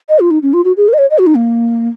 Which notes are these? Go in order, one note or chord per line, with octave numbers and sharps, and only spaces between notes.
D#5
F4
D#4
C#4
F4
F#4
G#4
A#4
D#5
C#5
D#5
F#4
D#4
A#3